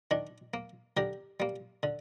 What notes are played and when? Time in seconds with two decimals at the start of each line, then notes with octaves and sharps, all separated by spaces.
0.11 D#3 D4
0.54 A#3
0.97 D3 G4 A#4
1.40 G3 A#3
1.83 D3